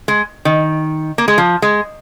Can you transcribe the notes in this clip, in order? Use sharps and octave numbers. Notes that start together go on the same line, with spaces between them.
G#3
D#3
A#3
G#3
F3
G#3